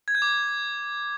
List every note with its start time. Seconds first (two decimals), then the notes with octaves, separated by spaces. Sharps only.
0.08 G#6
0.15 G6
0.22 D6